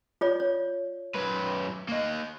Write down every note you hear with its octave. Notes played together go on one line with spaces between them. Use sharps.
F4 C#5 D5
C#5
F#2 B4
A#3 D#5